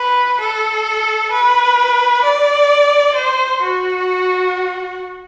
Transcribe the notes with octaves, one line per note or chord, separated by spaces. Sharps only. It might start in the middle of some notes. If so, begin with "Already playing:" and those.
Already playing: B4
A4
B4
D5
C5
F#4